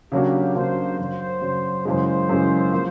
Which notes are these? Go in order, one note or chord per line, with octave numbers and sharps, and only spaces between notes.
C#3 F#3 A#3 D4 F#4 G4
C#3 F#3 A#3 D4 F#4 C5
F#2 C#3 F#3 C5
F#2 C#3 F#3
F#2 C#3 E3 G#3 C5
F#2 C#3 E3 G#3
F3 A#3